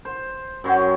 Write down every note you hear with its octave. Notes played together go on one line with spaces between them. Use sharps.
C5
F#2 F#3 C#5 G5